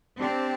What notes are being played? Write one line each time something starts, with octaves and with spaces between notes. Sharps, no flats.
C4 D4 G4 D5 A5